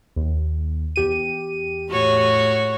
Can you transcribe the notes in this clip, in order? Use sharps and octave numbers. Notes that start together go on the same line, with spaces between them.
D#2
E2 G4 D#7
A2 F#4 C#5